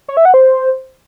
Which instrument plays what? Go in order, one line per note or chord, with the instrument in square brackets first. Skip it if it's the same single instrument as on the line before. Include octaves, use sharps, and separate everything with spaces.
[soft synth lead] C#5
E5
F#5
C5